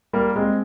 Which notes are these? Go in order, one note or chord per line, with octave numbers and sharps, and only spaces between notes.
G3 A#3
G#3 C4